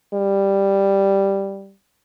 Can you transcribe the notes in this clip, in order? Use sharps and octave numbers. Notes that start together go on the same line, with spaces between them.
G3